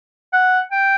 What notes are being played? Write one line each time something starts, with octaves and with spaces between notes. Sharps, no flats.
F#5
G5